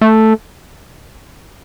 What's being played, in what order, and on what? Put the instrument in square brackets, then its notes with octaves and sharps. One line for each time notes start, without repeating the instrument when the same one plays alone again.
[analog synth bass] A3